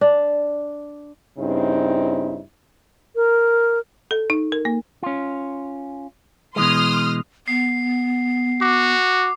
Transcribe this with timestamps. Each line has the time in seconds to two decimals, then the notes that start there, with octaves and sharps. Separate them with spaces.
0.01 D4
1.38 G2 C#3 C4 D#4 E4
3.16 A#4
4.11 A4
4.30 D#4
4.52 A#4
4.65 A#3
5.03 C#4 F4
6.56 B2 E3 G#3 C6 D#6 F6
7.48 B3 C7
8.61 F#4 D6